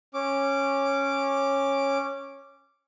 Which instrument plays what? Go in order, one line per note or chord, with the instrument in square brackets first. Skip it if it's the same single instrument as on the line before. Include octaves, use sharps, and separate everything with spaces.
[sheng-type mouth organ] C#4 D6